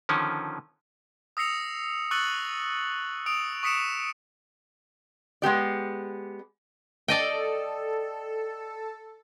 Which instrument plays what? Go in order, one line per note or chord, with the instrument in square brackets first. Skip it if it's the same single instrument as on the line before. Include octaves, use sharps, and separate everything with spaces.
[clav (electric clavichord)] D3 D#3 F3 C#4
[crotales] D#6 E6 A#6 C7 C#7 F7
C#6 E6 F#6 A6 C#7 F#7
D#6 D7 F7
C#6 D#6 B6 C#7 D7 E7
[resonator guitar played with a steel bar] G#3 B3 G4 D5
[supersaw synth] A4 [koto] D5 D#5 G5